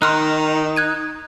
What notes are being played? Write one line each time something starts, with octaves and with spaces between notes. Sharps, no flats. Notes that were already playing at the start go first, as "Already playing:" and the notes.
D#3 D#4 C6 F6 F#6
F#6 G#6 D#7